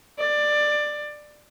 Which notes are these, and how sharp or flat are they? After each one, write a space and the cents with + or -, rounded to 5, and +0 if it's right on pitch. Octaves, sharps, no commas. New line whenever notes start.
D5 +15